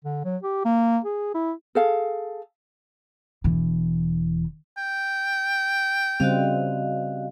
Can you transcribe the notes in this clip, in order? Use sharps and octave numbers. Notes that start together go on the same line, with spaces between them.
D3
F#3
G4
A#3
G#4
E4
G#4 A4 F5
E1 E3
G5
C#3 G3 C4 F#4 D#5 F5